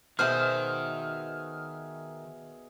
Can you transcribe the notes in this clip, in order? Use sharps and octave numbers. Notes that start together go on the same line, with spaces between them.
B2 D#3 G#4 C5 E5 F#5 C6 F6